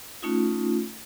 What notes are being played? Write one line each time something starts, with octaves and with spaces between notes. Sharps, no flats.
A3 C#4 D#4 F4